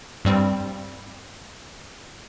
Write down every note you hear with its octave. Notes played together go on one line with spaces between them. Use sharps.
G2 G3 C4